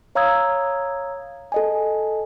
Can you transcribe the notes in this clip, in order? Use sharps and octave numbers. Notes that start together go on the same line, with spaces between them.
C#5 F5 A#5 D#6 E6 G#6
A4 D#5 G#5